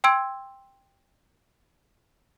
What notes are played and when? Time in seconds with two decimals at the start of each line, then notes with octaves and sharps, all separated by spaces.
0.04 G5 C6 E6 G#6 D7